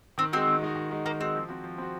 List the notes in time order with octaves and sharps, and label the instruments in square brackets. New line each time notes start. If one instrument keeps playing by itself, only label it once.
[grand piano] D#3 [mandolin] C4
[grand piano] G#3 D#4 F#4 [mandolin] C4
[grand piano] D#3
G#3 D#4 F#4
D#3
G#3 D#4 F#4
[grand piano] D#3 [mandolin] A#3
[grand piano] G#3 D#4 F#4 [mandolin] C4
[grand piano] F3
C4 F#4
F3
C4 F#4